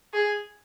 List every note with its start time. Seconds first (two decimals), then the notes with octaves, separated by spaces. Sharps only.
0.13 G#4